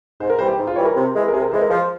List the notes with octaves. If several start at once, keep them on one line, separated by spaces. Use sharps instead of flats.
G#2 C5
A#4
E3 G3 C5
G4
G#2
F4
E3 G3 C#5
A#4
C3
E3 G#3
A#4
C3 G#4
A#4
E3 G#3 C5
A#4
F3 C5